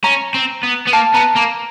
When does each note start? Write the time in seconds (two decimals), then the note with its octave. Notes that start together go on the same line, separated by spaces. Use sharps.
0.04 C#4 A#5
0.34 C4
0.63 B3
0.87 B3
0.93 A#3 A5
1.15 B3 A#5
1.36 A#3 A#5